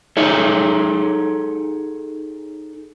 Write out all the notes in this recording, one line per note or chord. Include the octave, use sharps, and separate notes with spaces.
D#4 G#4 A4 C#5